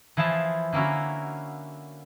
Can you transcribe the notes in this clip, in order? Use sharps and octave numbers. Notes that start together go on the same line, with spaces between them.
E3 F3 E4 G#4 A5
D3 A#3 C#4 E4 F#4